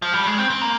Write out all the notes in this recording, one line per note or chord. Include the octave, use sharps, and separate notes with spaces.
F3
G3
G#3
C4
C4
A#3